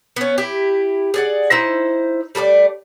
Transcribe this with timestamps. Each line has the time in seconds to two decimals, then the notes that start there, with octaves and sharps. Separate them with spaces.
0.16 B3 C#4
0.38 E4 G4
1.14 G#4 D5 F#5
1.51 D#4 E4 C5
2.35 G3 A3 A#4 D5